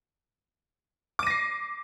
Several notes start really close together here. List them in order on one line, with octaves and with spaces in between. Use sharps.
D6 D#7 A#6 C7